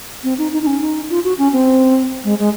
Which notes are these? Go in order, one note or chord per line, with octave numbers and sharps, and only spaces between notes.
C4
D#4
D#4
D#4
C#4
D#4
F4
F#4
C#4
C4
G#3
G#3